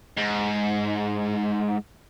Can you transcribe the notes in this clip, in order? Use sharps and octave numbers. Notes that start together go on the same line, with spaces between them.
G#2